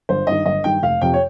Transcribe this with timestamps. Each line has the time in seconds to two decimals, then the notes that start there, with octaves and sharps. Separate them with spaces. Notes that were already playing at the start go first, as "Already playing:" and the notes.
0.09 G1 C5
0.27 G2 D#3 D#5
0.46 G1 D#5
0.64 G2 D#3 G5
0.83 F1 F5
1.01 F2 C3 F3 G5
1.14 C#5